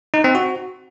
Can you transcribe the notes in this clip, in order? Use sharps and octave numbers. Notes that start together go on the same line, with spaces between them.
D#4
C4
F#4